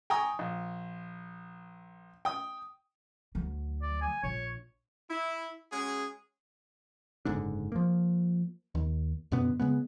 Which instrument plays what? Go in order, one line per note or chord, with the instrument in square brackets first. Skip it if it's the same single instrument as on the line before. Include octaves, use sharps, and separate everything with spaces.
[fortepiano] G5 G#5 A#5 C#6 D#6
A#1
G5 D#6
[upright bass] D2 F#3
[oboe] D5
G#5
[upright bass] A#1 [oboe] C#5
[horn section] E4
G#3 C#4 F#4 G#4
[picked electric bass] F#1 G#2 D3 D4
F3 A#3
D#2
F#2 B2 D3 B3
C#3 G#3 B3